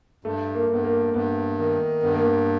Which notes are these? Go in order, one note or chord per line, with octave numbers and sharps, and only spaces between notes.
G2 A3
A#3
G2 B3
A#3
G2 B3
D#3
G2 B3
A#3
B3